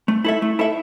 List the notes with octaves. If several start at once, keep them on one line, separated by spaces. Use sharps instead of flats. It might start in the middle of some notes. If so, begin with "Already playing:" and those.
A3
E4 A4 E5
A3
E4 A4 E5